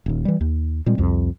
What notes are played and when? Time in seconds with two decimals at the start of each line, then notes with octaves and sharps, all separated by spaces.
0.06 D#1 D#2
0.25 E3 G3
0.41 D#2
0.86 A#2 G3 G#3 C4
0.98 C2 F2